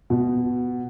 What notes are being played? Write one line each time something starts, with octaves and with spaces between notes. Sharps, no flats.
B2